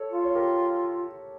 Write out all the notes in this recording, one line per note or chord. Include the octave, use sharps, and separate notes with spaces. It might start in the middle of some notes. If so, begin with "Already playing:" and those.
Already playing: A4 C#5
F4
C#5
G4 A#4